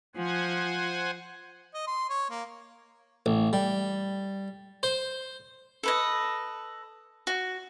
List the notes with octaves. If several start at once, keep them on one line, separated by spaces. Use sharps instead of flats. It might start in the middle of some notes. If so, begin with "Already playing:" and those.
F3 C5 F#5 G#5
D#5
C6
C#5
A#3
A1
G3
C5
A4 B4 D#5
F#4